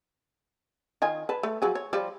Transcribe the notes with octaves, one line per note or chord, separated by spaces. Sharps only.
D#3 F4 G#5
B4 A5
A3
F3 F#3 G#4
C#5
F3 G3